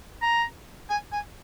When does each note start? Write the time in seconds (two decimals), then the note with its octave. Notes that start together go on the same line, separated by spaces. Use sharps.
0.22 A#5
0.89 G#5
1.12 G#5